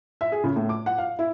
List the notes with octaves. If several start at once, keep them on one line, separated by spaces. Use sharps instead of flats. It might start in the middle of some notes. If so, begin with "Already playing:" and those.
E5
G#4
C#3
A2
D6
F#5
F5
E4